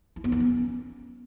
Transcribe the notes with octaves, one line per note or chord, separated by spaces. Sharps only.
E4
B3
D4
C#4